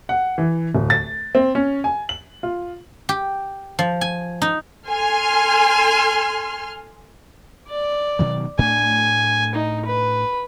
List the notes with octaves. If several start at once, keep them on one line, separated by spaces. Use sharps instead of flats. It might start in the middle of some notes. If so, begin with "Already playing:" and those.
F#5
E3
D1
A6
C4
C#4
G#5
F#7
F4
G4
F3
G#5
D#4
A4 G#5 C6 F6
D5
B2 D#3 F#3
A2 A3 D4 G#5
D#4
B4